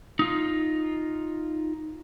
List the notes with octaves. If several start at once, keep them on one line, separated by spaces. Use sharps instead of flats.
D#4 F4